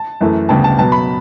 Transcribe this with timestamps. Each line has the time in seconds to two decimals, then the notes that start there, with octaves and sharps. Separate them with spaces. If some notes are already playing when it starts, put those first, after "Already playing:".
Already playing: A5
0.21 F#2 E3 A3
0.49 D2 C#3 G3 B3 A5
0.64 A5
0.78 B2 F#3 B3 A5
0.92 B5